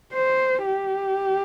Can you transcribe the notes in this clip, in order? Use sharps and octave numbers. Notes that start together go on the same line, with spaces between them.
C5
G4